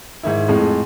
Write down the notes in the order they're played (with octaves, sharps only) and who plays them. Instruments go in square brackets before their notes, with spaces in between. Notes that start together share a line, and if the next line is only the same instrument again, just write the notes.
[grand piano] G#2 D#3 E4
F2 A2 G#3